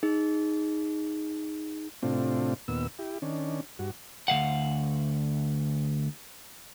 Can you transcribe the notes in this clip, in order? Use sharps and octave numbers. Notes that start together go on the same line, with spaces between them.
D#4 G#4
A2 C3 C4 D4 F4
D#2 A#2 B3 E6
E4 G4
D#3 C#4 D4
G2 F#4
D2 E3 F5 F#5